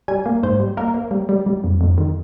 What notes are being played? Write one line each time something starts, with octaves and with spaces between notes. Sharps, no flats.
G3 G#5
A#3
G#2 C5
G3
A#3 A#4
A#3
G3
G3
G3
F2
F2
D#3